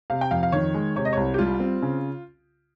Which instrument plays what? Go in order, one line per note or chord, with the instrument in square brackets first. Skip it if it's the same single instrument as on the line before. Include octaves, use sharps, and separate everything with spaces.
[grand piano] C3 [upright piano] F5
[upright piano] G5
[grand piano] F2 [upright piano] F5
[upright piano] F5
[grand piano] D#3 [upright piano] C#5
[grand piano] G#3
[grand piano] C3 [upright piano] C#5
[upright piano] D#5
[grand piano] C2 [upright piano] C#5
[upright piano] G4
[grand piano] G3 [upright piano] F4
[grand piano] C4
C#3